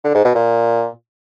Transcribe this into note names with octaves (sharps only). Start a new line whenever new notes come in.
D3
G#2
B2
A#2